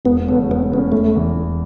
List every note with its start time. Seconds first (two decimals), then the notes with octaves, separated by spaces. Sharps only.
0.05 E1 B3
0.27 E2 C#3 A3 B3 C#4
0.48 E1 B3
0.70 E2 C#3 A3 B3 C#4
0.92 E1 A3
1.14 E2 E3
1.36 E1